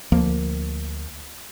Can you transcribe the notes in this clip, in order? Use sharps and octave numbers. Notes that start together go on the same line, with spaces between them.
D2 F3 A#3